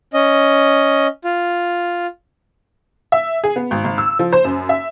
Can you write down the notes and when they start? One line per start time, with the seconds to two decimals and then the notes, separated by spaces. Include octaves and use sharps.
0.13 C#4 D#5
1.25 F4
3.12 E5
3.44 G#4
3.56 B3
3.71 G#1
3.84 G#1
3.98 E6
4.19 F3
4.33 C5
4.44 F#2
4.69 E5